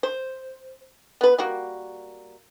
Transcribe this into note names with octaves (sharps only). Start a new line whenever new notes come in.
C5
B3 B4
G3 A#3 F#4